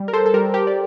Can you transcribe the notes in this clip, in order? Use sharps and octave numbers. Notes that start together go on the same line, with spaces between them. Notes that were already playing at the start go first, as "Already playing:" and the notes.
Already playing: G3
A#4
A4 C5
A4
G3 G4 A#4
G4 A#4
D5